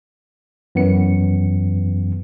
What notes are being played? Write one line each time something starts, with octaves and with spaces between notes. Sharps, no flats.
F#2 E3 B3 C#7